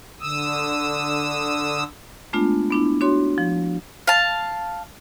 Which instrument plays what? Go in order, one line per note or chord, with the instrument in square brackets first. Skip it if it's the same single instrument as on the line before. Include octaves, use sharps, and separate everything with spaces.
[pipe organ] D3 D#6 E6
[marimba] G#3 A3 B3 D4 F4
B3 D4 E4
D4 F#4 C#5 C6
F3
[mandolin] F5 A5